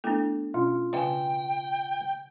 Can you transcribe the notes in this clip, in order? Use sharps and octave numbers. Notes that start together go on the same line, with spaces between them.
A3 B3 D4 E4 A4
B2 C#4 F4
C#3 F5 G5 G#5